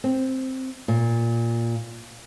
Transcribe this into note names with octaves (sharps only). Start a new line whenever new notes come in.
C4
A#2